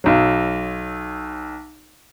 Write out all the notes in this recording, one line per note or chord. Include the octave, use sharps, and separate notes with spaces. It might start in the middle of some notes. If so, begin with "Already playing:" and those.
B1 F#3